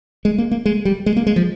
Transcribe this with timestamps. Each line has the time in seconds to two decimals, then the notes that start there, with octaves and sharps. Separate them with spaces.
0.25 G#3
0.38 A#3
0.51 A#3
0.66 G#3
0.85 G3
1.06 G#3
1.17 A#3
1.27 G#3
1.36 F3